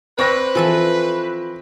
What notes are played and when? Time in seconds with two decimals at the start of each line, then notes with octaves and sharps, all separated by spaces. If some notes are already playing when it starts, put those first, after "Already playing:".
0.19 C4 B4 D5 C#6 A#6
0.55 E3 F3 A4 E5